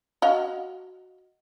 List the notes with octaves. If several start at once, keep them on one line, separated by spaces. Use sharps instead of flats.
F#4 D#5 F5